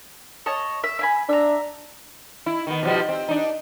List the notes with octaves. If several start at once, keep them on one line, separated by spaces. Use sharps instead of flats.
C#5 D#5 A5
E5
E5 G#5 B5
D4 E5 A#5
E4
D#3 B3
B2 F3 G3
C4
D4 D#4